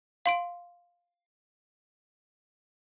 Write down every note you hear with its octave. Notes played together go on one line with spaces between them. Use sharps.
F5 C6 D7